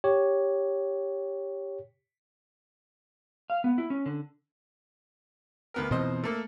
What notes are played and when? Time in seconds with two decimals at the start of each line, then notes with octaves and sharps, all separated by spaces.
0.04 G4 C#5
3.50 F5
3.64 B3
3.78 E4
3.90 C#4
4.06 D3
5.74 D2 B3 A#4
5.91 F2 B2 E3 C5 D#5
6.24 A3 A#3 A4